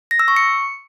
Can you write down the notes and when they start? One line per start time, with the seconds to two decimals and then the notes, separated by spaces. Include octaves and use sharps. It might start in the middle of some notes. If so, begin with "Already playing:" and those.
0.11 A#6
0.19 E6
0.28 C#6
0.36 C#7